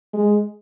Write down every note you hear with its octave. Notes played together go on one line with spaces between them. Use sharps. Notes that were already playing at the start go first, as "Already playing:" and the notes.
G#3